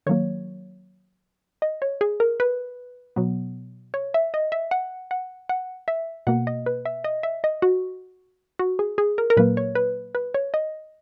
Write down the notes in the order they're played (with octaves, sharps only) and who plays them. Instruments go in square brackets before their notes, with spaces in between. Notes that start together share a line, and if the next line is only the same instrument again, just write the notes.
[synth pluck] D#3 F#3 A#3 C#5
D#5
C#5
G#4
A#4
B4
B2 F#3 B3
C#5
E5
D#5
E5
F#5
F#5
F#5
E5
B2 A#3 F#5
D#5
B4
E5
D#5
E5
D#5
F#4
F#4
G#4
G#4
A#4
A#4
A#2 F#3 A#3 B4
C#5
B4
B4
C#5
D#5